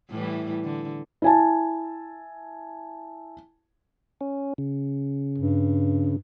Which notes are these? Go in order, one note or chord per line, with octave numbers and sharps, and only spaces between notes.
A2 E3 G3
D3
E4 G#5 A5
C#4
C#3
G2